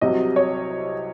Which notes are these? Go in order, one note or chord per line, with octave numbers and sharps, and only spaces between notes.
C2 C3 F#3 D#5
C#5